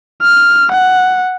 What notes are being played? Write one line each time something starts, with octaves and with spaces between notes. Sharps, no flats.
F6
F#5